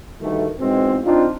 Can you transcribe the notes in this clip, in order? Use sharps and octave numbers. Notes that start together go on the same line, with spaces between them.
D2 G2 D#3 A3
E2 G#2 B2 G#3 C4
C4 D4 D#4 F4